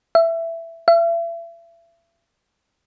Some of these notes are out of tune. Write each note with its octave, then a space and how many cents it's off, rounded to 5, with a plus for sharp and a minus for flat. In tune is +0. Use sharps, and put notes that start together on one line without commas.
E5 +10
E5 +35